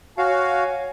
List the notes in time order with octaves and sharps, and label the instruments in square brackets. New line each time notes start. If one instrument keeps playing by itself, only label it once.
[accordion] F#4 F5 [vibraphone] C#5 [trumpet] G#5